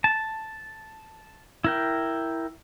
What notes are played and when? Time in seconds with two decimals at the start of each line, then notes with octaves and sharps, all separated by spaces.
0.04 A5
1.64 E4 A#4 G5